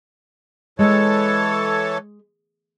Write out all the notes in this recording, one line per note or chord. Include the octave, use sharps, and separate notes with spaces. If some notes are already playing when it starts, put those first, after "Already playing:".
E3 G#3 A4 C#5